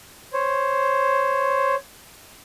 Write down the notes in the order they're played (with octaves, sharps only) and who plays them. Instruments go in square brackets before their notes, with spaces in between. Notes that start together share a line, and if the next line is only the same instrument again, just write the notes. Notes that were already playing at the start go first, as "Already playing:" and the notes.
[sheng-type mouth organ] C5 C#5